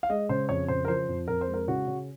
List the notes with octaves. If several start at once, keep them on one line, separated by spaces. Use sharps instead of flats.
F5
G#3 D#5
C#3 C5
F2 C#5
C#3 C5
A#4
F3 C5
F2
F2 A#4
C5
G#3
A#4
C#3 F#4
C#3